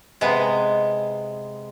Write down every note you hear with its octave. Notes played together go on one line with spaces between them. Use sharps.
C3 G#3 B3